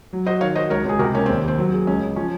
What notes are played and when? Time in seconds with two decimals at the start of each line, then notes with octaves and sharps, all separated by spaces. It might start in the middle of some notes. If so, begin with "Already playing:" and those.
0.13 F#3
0.26 F#4 C5 D#5
0.41 D#3 C#5 F5
0.55 F#4 C5 D#5
0.70 C#2 A#4 C#5
0.85 C#2 G#4
0.99 C3 F#4 A#4
1.14 A#3 C#4
1.26 D#2 C4
1.43 D#2 C4
1.58 F#3
1.72 G#4
1.87 C#2 C#4
2.01 C#2
2.16 F3 C#4